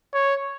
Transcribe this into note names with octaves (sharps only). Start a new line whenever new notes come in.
C#5